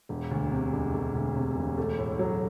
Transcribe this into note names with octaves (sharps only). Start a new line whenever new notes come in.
E1
D2
C3
E1
E1
D2
C3
E1
A3
A2
F#3